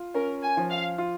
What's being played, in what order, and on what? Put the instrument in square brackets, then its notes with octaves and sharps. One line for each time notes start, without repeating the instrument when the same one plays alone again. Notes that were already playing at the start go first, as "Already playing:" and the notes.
Already playing: [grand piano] F4
[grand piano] C#4 [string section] A#4
[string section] G#5
[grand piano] F3
[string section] F5
[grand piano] F4